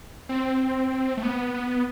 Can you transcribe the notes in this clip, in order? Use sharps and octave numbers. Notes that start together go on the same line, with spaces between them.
C4
A3
B3
B3